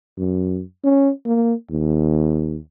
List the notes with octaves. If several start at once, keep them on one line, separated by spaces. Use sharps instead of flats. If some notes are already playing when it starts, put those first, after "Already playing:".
F#2
C#4
A#3
D#2